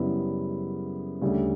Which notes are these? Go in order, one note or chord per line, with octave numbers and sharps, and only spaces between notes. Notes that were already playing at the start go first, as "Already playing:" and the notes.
Already playing: F#2 C#3 G3 B3 E4
D2 C#3 G3